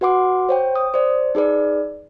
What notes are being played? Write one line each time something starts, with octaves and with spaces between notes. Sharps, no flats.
F#4 B4 F#5 C6 D6
C5 C#5 G5
D#6
C5 D5
D#4 G#4 B4 D5